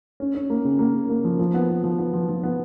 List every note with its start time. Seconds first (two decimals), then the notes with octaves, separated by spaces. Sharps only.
0.20 C#4
0.35 C#4
0.50 A#3
0.65 C#3
0.79 A#3
0.94 C#3
1.09 A#3
1.24 F3
1.39 F3
1.54 B3
1.69 B3
1.84 F3
1.99 B3
2.13 F3
2.28 F3
2.43 B3